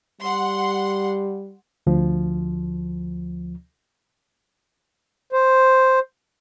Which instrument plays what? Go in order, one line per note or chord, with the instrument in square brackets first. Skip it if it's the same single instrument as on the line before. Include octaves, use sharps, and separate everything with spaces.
[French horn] G3 [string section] F#5 C6
[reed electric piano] D2 F3
[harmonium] C5